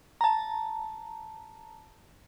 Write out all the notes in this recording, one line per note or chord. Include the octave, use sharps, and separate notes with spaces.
A5 A#5